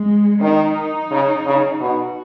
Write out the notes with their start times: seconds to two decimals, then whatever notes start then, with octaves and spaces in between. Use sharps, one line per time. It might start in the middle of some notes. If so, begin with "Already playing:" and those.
Already playing: G#3
0.41 D#3 D#4
1.11 C#3
1.46 C#3
1.80 B2 F#4